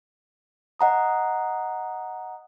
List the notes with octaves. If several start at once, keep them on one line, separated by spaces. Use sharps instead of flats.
D#5 F#5 A#5 D#6